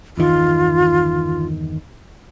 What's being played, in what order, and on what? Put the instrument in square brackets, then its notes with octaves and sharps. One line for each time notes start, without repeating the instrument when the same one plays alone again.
[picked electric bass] G1 E2 D#3 [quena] F4